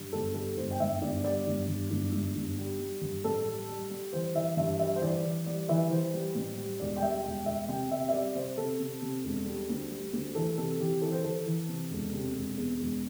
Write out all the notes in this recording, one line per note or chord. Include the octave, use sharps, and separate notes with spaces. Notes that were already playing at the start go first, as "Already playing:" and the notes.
Already playing: G2
G1 A4
G3 A4
G1 C5
G5
G1 E5
G1 D5
G3 D5
G1
G2
G1
G1
G1
G3
G3
G2
A1 A4
G3
G3
G3
E3 C5
E3 E5
G2 E5
G3 E5
C5
E3 D5
E3
G3 D5
E3 E5
E3 C5
G3
A1
G3
E1 D5
G5
G3 E5
E1 G5
E1 E5
C3 G5
C3 E5
E5
G3 D5
C3 C5
C3 A4
C3
C3
E1
G3
D2
G3
D2
E3 A4
C3 A4
E3 G4
E3 A4
C5
E3 A4
E3
C3
E1
C3
E1
E2
E1